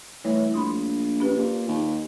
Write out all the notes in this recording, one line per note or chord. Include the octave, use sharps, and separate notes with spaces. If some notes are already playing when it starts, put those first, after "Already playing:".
E3 G3 A3 C#5
A#1 B5 C6 D#6
C#4 G4 B4
A#2
D#2